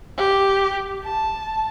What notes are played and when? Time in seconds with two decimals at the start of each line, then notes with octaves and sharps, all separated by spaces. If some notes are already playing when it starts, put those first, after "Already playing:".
0.17 G4
1.03 A5